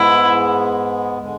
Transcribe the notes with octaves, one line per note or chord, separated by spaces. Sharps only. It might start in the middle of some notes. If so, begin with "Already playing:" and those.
Already playing: G#2 G#3 B3 E4
D3 G#3